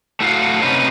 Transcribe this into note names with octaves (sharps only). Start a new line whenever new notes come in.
A3 E4 F#4 F5 F#5
C3 C#4 D#4 B4